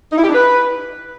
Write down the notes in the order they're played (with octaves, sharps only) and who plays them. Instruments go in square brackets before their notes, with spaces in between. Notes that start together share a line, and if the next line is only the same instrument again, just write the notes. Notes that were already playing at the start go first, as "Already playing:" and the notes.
[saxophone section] D#4
E4
G4
D4
B4